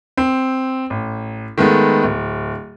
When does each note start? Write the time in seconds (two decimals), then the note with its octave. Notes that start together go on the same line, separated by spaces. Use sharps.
0.17 C4
0.90 A1
1.58 D#3 G#3 A3 B3
2.03 D1